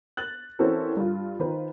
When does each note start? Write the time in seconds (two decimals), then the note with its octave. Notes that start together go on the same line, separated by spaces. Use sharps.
0.17 F#6 A6 F#7
0.59 E3 C4 C#4 F#4 A4 A#4
0.97 G2 F4
1.39 D#3 F4 B4 C5